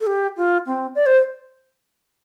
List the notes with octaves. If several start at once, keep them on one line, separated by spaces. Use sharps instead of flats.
A4
G4
F4
C4
D5
C5